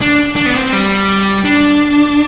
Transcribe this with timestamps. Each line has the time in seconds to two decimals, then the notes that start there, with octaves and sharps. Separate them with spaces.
0.01 D4
0.36 D4
0.46 B3
0.55 C4
0.73 G3
1.45 D4